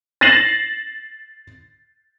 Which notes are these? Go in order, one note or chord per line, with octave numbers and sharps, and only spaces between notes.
A6 A#6 C7 E7 F#7